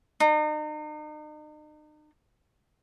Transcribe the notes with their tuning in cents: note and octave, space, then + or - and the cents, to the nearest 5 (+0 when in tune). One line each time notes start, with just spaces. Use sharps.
D#4 -40